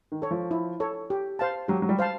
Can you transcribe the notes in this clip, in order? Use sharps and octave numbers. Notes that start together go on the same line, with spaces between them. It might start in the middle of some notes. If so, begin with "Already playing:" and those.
D#3
A4 C#5
F3
E4
A4 C#5
G4
C5 F5 A5
F#3 G4
F#3
G3
C5 F5 A5